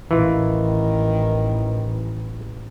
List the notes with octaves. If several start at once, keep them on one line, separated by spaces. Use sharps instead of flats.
A1 D#3 E3 F4